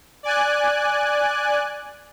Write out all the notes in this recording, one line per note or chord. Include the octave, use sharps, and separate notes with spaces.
D5 G#5 F#6